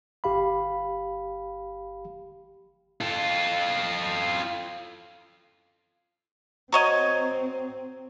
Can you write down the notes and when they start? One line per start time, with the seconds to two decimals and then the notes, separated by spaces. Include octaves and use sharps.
0.24 G1 G4 F5 B5
3.01 F4 A4
6.72 C4 F#4 C#5 D#5 A#5 G#6